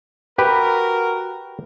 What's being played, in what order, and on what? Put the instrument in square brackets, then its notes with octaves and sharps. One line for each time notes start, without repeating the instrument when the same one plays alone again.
[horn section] F#4 A#4 [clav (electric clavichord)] G4 B4